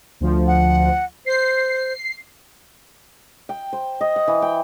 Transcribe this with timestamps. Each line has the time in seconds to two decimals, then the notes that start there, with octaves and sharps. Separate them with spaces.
0.20 D2 F3
0.47 F#5
1.26 C5 C7
3.49 G5
3.73 C5
4.01 D#5
4.16 F#5
4.28 E3
4.42 G5